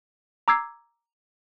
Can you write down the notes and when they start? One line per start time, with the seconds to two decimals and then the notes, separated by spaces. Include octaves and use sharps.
0.48 A#5 D6 E6 G#6 C7